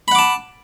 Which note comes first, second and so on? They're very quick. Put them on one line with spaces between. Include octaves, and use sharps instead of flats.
B5 F#5 D6 A5